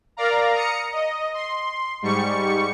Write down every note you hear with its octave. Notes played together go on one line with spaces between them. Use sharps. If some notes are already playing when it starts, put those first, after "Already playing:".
A#4 D5 F5 A#5
A#5 D#6 C#7
D#5
C6
G#2 G3 C#6 C#7